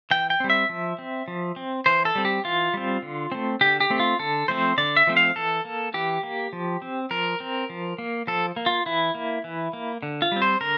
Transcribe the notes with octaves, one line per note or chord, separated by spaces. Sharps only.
E3 G5
G5
G3 C4
E5
F3
C4
F3
C4
E3 C5
A4
G3 C4
G4
E3 F4
G3 C4
D3
A3 C4
D3 G4
G4
A3 C4
F4
D3 A4
F3 A3 C4 C5
D3 D5
E5
F3 A3 C4
F5
E3 A4
A#3
E3 G4
A#3
F3
C4
F3 A#4
C4
F3
A#3
F3 A4
A#3
F4
E3 E4
A#3
E3
A#3
D3
F4
G3 C4
C5
D3 A#4